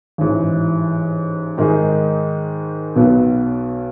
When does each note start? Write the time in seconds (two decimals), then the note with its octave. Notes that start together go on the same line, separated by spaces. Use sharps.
0.18 A1 G#2 E3
1.57 G#2 D#3 G#3 D#4 G#4
2.96 B1 B2 F#3 B3